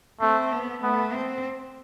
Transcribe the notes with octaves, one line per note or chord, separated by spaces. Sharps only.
A3 C4
B3
A3 B3
C4